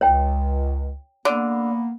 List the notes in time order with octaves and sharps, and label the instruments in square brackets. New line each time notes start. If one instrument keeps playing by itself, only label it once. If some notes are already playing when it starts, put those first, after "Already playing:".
[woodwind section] C#2 [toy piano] C#5 G5
[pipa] D3 [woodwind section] A#3 B3